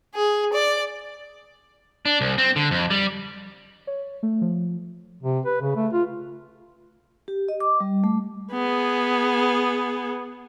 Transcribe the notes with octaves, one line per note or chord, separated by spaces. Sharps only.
G#4
D5
D4
C2
C4
D3
F2
G3
C#5
A3
F3
C3
B4
C#3
A3
F4
G4
D#5
D6
G3
A3
B3 G#4